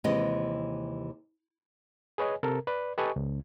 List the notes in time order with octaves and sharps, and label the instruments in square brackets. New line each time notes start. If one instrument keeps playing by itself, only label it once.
[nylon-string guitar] D#2 C3 E3 G#3 G4 D#5
[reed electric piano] G#4 B4 C#5 D#5 G#5
C3 A4 A#4
B4 D5
G4 A4 B4 D#5 G#5 C#6
C#2